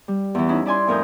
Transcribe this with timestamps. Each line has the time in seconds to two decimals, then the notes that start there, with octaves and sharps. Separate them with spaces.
0.08 G3
0.35 E2 E3
0.49 C#4 D#4 E4
0.66 E4 D5 G#5 C6
0.88 F2 A2 A#4 G#5 D#6 G6